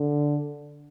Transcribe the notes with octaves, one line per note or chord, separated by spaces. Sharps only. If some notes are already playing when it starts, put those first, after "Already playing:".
Already playing: D3